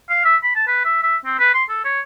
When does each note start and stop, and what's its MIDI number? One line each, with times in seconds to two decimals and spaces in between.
0.10 0.24 77
0.25 0.36 76
0.43 0.52 83
0.55 0.66 81
0.67 0.84 71
0.85 1.01 76
1.03 1.17 76
1.25 1.37 60
1.39 1.53 71
1.54 1.64 84
1.69 1.81 69
1.85 2.01 73